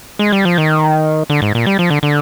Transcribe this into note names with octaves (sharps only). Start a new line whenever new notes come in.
G#3
G3
F3
D#3
D3
G#2
A#2
G3
F3
D3
D3